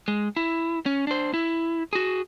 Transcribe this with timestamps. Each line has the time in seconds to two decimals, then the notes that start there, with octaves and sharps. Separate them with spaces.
0.08 G#3
0.37 E4
0.86 C#4
1.07 D4 C5
1.34 E4
1.93 F#4 G#4